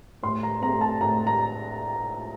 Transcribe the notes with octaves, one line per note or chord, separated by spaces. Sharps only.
A2 C6
A#5
A3 C4 A#5
A5
A2 A#5
A#5